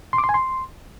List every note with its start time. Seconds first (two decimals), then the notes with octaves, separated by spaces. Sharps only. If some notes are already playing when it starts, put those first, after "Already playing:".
0.13 C6
0.18 D6
0.24 C6
0.29 G#5
0.34 C6